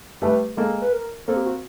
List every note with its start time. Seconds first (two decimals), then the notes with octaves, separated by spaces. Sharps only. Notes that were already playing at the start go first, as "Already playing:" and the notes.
0.22 G3 A3 B4
0.57 G#3 A#3 A4
0.81 B4
0.92 A#4
1.28 A#3 C4 A4
1.36 G4
1.46 F#4